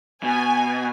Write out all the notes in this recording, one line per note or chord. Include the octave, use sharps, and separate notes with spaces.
B2 G#5